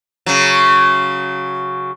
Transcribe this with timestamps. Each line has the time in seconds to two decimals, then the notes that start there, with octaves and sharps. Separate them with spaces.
0.26 C#3 F#3